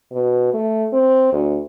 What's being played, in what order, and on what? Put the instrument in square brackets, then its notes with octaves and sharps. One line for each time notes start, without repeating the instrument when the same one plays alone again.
[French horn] B2
A3
C4
D2